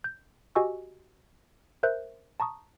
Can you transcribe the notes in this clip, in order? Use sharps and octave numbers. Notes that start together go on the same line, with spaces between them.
G6
F#4 G4 D#5 G#5 C#6 E6
A#4 C5 E5 F#6 G6
A5 A#5 C#6 D#6